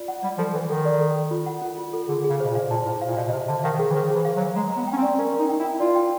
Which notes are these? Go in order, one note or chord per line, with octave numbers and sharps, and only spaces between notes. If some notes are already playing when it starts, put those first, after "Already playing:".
Already playing: F4 D5
F#5
G3 D5
F3 A4
E3 A4
D#3 A4
D5
A4
A4
F4
F#5
F4
F4
A4
D3 G#4
G#4
C#3
B2 C5
A#2
F5
A#2 A5
A2 C5
F5
A#2
B2 F5
B2
C3 C5
D3 A5
D#3 F5
D#3 G#4
E3
D#3 C5
E3 G#4
F5
F#3
F5
G#3 A#5
B3 A#5
G5
C#4
C4
D5
C#4 A#4
D#4 A#4
G5
E4
G5
F4 D5
G5